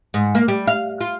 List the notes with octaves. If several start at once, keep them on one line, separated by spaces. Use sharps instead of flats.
G#2
A#3
G3
F5
F4